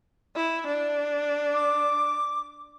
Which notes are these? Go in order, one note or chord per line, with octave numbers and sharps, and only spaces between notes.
E4
D4
D6